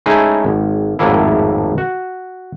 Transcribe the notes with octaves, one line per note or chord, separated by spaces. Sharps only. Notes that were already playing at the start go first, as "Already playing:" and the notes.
G#3 A3 C#4 D#4 E4 G#4
G#1
G#1 F2 A2 A#3 E4
F#4